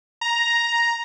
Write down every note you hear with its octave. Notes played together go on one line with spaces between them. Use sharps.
A#5